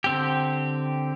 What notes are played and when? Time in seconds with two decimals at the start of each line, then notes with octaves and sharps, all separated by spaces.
0.04 D3 C4 G4